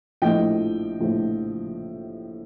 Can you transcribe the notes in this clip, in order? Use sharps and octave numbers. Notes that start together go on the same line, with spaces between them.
A#1 A2 F3 D#5 G5
A#1 A2 F3